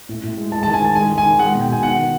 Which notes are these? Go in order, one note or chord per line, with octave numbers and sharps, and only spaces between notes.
A2
A2
G#3
G#3 A5
A5
D#3
G#5
D#3 A5
G#3 G#5
D#3
G#5
D#3
G#3 F#5
B2
G5
B2 G#5
D#3 F#5
D#3